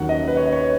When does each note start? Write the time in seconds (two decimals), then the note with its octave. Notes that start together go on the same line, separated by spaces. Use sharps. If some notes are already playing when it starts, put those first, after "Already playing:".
Already playing: D#2 D#3 F#3 C#4 F#5
0.09 D#5
0.28 B4
0.37 C#5
0.46 D#5
0.52 C#5
0.55 B4